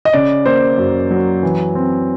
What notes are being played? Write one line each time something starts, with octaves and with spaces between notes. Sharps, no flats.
D#5
C#3 D5
A#3 C5
F#2
F#3
E3
C4